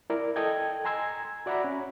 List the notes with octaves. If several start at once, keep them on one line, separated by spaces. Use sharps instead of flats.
E4 A#4 D5
A4 D#5 G5 G#6
G#5 A#5 C6 E6 G#6
F#4 D5 E5 F#5 A#5 B5
C#4